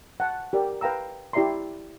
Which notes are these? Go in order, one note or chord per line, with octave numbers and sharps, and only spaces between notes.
F#5 A5
G4 A#4 D5
B4 F5 G5 A#5 E6
E4 G4 D5 E5 A#5 C6